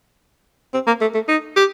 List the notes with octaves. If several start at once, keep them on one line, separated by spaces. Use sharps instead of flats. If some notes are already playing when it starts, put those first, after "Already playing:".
C4
A#3
A3
A3
D#4
G4